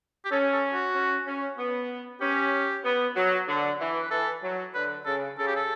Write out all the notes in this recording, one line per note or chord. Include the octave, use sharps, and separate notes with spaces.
G4
C#4 A4
A4
F#4
C#4
C#4
B3
C#4 G4
B3
F#3
D3
E3
B4
E3 A4
F#3
D3 B4
C#3 A4
C#3 A4
G4
A4